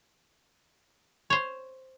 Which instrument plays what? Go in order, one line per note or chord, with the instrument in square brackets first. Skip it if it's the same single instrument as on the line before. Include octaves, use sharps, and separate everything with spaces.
[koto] C5 C#5